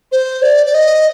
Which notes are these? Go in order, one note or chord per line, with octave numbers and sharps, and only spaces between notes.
C5
D5
D5
D#5